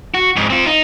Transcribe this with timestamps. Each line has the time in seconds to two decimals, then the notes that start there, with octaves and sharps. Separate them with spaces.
0.14 F#4
0.36 F2 G#2
0.50 C4 F4
0.66 D#4